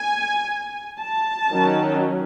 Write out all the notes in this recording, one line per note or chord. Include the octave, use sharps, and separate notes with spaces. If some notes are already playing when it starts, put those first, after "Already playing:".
Already playing: G#5
A5
D#3 F#3 C#4